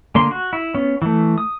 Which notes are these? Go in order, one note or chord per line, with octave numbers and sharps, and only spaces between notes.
D3 A#3 C6
F#4
E4
B3 C#4
E3 A3
D#6